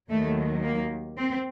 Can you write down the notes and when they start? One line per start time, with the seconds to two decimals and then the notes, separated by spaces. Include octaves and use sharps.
0.10 D#2 D#3 F#3 A3
0.63 A#3
1.18 C4